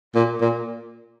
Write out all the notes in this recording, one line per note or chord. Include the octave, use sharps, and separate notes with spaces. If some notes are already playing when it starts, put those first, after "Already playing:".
A#2
A#2